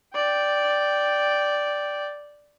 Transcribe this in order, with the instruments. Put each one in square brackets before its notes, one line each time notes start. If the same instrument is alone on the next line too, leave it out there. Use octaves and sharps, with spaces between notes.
[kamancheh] D5 G5